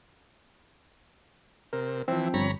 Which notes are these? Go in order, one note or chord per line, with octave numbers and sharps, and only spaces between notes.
C3 A#4
E3 F3 C4
G1 C#5 A#5 B5